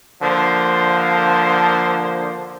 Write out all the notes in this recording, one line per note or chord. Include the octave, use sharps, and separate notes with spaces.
D3 F3 A#3 C5